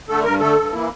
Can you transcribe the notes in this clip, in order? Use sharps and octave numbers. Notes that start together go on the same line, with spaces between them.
D3 A3 A4
G2 A#4
D3 A3 A4
G2
E3 A#3 E4